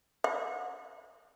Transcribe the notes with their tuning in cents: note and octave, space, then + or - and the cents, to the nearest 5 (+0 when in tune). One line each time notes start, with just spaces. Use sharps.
F#5 -30